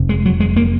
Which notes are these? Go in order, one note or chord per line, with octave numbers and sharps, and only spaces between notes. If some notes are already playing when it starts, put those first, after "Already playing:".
Already playing: F1 F2 C3
G#3
F#3
G#3
A#3